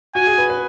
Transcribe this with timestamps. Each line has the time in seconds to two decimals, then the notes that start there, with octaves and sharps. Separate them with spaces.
0.15 F#4 G#5
0.27 G#4
0.38 B4
0.50 B4